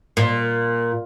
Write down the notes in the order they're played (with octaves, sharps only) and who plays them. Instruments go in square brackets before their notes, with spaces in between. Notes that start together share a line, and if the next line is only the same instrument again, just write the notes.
[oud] A#2